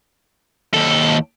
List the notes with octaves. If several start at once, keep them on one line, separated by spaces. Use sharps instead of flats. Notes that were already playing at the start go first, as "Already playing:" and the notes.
D#2 A4